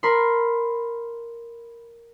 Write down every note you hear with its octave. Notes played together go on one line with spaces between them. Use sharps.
A#4 B5 C6